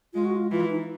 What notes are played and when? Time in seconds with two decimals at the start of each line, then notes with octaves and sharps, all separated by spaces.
0.14 G#3 F4
0.25 F#4
0.36 F4
0.51 E3 F4
0.70 D#4